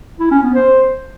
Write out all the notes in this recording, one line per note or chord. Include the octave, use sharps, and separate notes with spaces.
E4
C#4
B3
C5